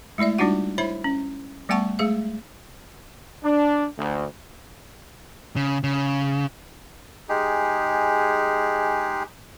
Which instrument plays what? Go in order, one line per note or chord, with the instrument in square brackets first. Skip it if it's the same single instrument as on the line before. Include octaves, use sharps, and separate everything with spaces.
[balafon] G#3 A3 E4 D5 E5
G3 D4 D#4 F4 F#4 F#5
E4 C5 C#5 E5 B5
C#4
G3 A3 B3 F#5 A5 C#6
G#3 A3 G#4 F5
[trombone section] D4
D2
[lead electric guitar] C#3
C#3
[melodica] G#3 D#4 G4 G#4